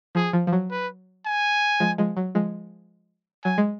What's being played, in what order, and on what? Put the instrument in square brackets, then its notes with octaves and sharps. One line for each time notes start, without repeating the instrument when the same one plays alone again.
[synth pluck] F3 [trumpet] G#4
[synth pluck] F3
F3
F#3
[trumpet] B4
G#5
[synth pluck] F3 G#3
F3 G#3
F#3
F3 G#3
[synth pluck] F#3 [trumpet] G#5
[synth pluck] G#3